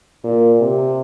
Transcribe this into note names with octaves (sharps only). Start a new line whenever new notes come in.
A#2
C3